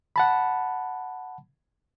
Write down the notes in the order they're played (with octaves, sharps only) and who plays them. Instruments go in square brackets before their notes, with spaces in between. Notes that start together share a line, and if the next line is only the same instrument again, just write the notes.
[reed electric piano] F#5 A5 B5